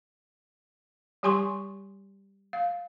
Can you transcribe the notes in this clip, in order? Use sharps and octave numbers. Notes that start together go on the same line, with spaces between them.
G3 G4 G#5 C6 C#6
F5